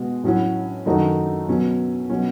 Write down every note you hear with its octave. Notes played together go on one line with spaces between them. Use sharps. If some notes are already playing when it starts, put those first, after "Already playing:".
Already playing: B2 G#3 F#4
A2 F#3 C#4 F#4
F#2 D#3 A3 D#4 F#4
B2 F#3 C#4
B2 F#3 C#4